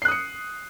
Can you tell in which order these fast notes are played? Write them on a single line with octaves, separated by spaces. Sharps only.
C7 F#6 D#6 C#7